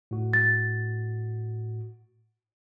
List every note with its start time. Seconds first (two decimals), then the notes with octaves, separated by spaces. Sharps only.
0.11 A2 F#4
0.33 A6